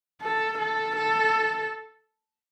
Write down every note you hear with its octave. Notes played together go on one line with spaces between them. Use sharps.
A4
A4
A4